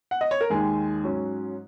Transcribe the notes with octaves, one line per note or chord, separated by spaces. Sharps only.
F#5
D#5
C#5
A#4
D#2 D#3 G#3 G#4
G#2 F#3 C#4